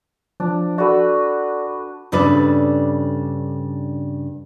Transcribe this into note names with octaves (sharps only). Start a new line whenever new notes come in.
F3 D4
F#4 A4 B4 D5
G2 C#3 D4 A4 B4 D5